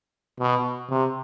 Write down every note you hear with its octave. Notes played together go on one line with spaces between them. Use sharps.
B2
C3